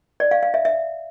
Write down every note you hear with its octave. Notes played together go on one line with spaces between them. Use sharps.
D5
F5
F5
E5
E5